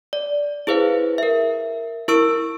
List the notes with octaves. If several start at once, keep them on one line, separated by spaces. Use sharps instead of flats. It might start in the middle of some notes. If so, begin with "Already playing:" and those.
D5
E4 G#4 B4 C5 F5
A#4 E5
E4 A#4 C#6 E6 D7